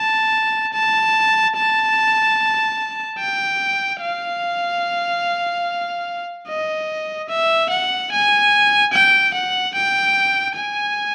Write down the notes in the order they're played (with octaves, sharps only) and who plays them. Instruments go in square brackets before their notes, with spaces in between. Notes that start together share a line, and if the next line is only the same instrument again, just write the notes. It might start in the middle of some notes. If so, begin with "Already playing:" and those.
Already playing: [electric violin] A5
A5
A5
G5
F5
D#5
E5
F#5
G#5
G5
F#5
G5
G#5